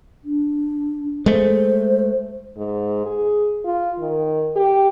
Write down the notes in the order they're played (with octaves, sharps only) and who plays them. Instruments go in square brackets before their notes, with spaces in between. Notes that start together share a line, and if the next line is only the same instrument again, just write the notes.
[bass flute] D4
[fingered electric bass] G#3 A3 [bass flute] C5
[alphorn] G#2
G#4
F4
D#3
G4